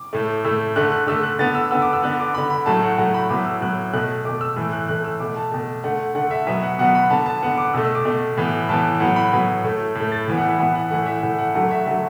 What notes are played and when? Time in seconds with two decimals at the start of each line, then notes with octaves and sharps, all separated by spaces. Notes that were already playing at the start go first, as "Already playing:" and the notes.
Already playing: D6
0.13 A2 A3
0.45 A2 A3 E6
0.76 D3 A3 F#6
0.92 F#6
1.07 D3 A3 E6
1.23 F#6
1.39 D3 B3 A6
1.55 E6
1.71 D3 B3 E6
1.82 D6
1.93 E6
2.02 D3 B3 F#6
2.19 D6
2.34 D3 B3 B5
2.50 B5
2.66 A2 F#3 A3 A5
2.82 F#5
2.98 A2 F#3 A3 F#5
3.14 B5
3.29 A2 F#3 B3 D6
3.46 E6
3.61 A2 F#3 B3 F#6
3.93 B2 A3 F#6
4.25 B2 A3 D6
4.41 E6
4.56 A2 E3 A3 E6
4.72 F#6
4.88 A2 E3 A3 F#6
5.05 E6
5.20 B2 A3 D6
5.36 A5
5.52 B2 A3
5.84 D3 A3 F#5
6.15 D3 A3 F#5
6.31 E5
6.47 B2 F#3 B3 E5
6.63 F#5
6.79 B2 F#3 B3 F#5
6.95 B5
7.10 D3 B3 A5
7.26 A5
7.43 D3 B3 F#5
7.58 D6
7.73 B2 A3 E6
7.85 E6
7.95 D6
8.05 B2 A3
8.37 A2 E3 B3
8.69 A2 E3 B3 A5
9.00 A2 F#3 B3 F#5
9.16 B5
9.32 A2 F#3 B3
9.64 A2 A3
9.95 A2 A3
10.12 A6
10.28 A2 E3 B3
10.38 F#5
10.49 E5
10.59 A2 E3 B3 F#5
10.75 F#5
10.90 A2 E3 A3 F#5
11.06 E5
11.22 A2 E3 A3 F#5
11.39 F#5
11.54 D3 F#3 A3 F#5
11.71 E5
11.86 D3 F#3 A3 E5